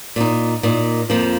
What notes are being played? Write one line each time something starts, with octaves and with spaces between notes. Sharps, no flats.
A#2 A#3 D#4
A#2 A#3 D#4
F2 F3 A#3